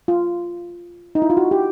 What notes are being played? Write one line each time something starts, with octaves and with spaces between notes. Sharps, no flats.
F4
D#4
E4
F4
F#4
G4